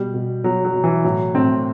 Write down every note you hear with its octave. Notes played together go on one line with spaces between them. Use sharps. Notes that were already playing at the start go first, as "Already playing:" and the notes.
Already playing: B2 G3
B2
B2 F#3
F#3
B2
E3
A2 F#3
A2 C4